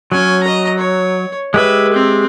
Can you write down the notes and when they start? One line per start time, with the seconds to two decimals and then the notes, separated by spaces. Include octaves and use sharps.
0.12 F#3 C#4 G#5
0.43 D#5 A#5
0.79 C#5
1.54 G#3 G4 B4 E5
1.93 C4